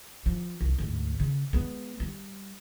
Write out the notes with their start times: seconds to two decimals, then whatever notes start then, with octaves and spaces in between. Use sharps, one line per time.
0.26 F3
0.61 C2
0.78 D2 G#2
1.20 C#3
1.53 G#3 B3
2.00 G3